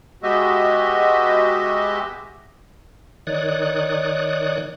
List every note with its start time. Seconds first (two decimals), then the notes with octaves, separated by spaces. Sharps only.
0.23 G#3 B3 F#4 G4 D#5 E5
3.27 D#3 C#5 D5 D#6 F#6